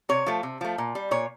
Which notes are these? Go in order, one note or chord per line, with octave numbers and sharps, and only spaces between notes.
C3 C#5
F3 A3
C3
F3 A3
A#2
G3
A#2 C#5